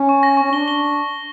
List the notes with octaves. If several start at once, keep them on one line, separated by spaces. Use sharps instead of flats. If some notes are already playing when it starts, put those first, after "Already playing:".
Already playing: C#4
C#6
A#6
C#6
C#4
D4 G7
G7